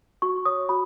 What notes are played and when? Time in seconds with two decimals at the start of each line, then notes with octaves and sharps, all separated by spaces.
0.22 F#4 C#6
0.45 C#5 D#6
0.69 F#4 B5